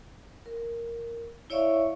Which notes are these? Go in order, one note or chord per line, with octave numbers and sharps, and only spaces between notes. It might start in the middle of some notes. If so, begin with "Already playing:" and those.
A#4
E4 C#5 D5 E5 F5 C#6